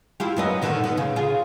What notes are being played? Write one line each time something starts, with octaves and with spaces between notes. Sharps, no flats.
E4 F4 G4
F#2 B3 D#5
D3 D#3 F#4
B3
C#3
F4 G#4